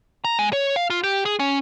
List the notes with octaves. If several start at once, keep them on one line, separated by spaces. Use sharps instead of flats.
A#5
G#3
C#5
F5
F4
G4
G#4
C#4